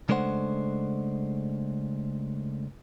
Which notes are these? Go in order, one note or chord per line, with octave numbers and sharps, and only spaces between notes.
C#3 G#3 A3 D4 C5 F#5